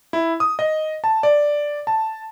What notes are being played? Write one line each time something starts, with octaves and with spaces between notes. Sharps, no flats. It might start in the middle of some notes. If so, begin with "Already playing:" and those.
E4
D#6
D#5
A5
D5
A5